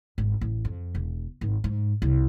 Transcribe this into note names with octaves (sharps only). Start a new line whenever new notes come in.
G#1
A1
F2
E1
G#1
G#2
C2